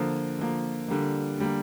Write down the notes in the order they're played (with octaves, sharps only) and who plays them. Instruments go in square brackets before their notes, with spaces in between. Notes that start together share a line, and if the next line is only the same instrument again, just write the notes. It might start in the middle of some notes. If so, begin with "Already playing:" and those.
Already playing: [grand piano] D3 F3 A#3
D3 F3 A#3
D3 G3 A#3
D3 G3 A#3